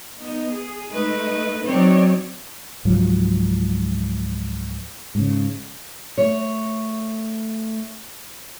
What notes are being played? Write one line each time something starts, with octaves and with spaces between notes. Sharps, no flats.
B3 D#4
G#4
G#3 A3 D#4 B4
F#3 C4 D#4 C#5 D5
C#2 G#2 F3 F#3
G#2 C#3
A3 C#5